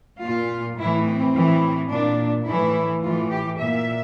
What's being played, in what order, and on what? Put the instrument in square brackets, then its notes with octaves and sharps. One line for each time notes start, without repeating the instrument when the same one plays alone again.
[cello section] A#2 F4
A2 E3 E4
C4
A2 E3
A#2 D4
A2 E3 E4
A2 E3 F4
G4
A#2 E5